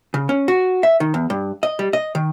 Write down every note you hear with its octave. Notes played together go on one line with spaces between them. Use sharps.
C#3
C#4
F#4
E5
D#3
E2
G2
D#5
G3
D#5
D#3